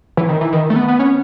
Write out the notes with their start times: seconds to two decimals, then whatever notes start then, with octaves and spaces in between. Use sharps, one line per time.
0.17 E3
0.29 D#3
0.41 E3
0.53 D#3
0.70 A3
0.76 B3
0.88 B3
0.99 C#4